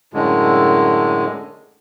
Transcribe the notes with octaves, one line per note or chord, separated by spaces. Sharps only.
F#2 A2 D3 G#3